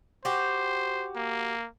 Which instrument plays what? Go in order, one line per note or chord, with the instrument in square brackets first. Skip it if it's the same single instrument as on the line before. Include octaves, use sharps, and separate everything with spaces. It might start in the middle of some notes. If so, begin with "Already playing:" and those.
[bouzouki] F#4 G4 [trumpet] C5
[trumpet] A#3